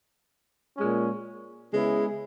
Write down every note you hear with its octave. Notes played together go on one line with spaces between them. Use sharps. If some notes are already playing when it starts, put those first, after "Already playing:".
A#2 G#3 C#4
C#3 G#3 B3 E4 G#4